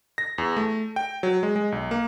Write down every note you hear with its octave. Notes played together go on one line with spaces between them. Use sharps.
A#6
E2
A3
G5
F#3
G#3
G#3
B1
A#3